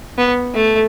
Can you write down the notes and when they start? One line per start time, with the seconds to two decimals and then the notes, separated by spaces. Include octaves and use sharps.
0.18 B3
0.55 A3